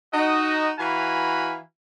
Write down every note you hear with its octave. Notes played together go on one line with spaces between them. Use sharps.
D#4 F#4 D#5
E3 F#4 F5 G#5 A#5 B5